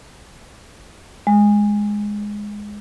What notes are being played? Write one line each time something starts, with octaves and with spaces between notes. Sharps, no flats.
G#3